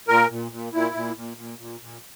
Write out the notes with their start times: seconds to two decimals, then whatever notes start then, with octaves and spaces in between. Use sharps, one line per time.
0.08 A#2 A#4
0.30 A#2
0.52 A#2
0.73 A#2 E4
0.95 A#2
1.16 A#2
1.37 A#2
1.59 A#2
1.80 A#2